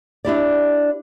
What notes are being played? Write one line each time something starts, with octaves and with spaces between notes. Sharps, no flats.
D4 E4 G4 D5